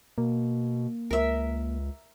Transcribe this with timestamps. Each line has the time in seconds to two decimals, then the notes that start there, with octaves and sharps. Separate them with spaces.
0.18 B2 A#3
1.11 C#2 A#4 E5